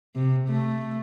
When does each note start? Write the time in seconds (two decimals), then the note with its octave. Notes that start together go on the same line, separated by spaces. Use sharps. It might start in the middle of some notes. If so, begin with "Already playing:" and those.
0.15 C3
0.48 A3